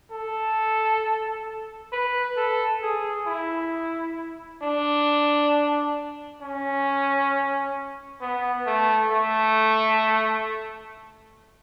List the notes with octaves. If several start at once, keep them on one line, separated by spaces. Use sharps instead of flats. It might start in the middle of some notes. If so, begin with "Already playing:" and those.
A4
B4
A4
G#4
E4
D4
C#4
B3
A3
A3